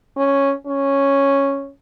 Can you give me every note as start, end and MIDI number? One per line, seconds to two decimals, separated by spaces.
0.17 0.53 61
0.67 1.70 61